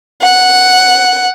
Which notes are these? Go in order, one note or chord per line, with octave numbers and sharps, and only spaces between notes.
F#5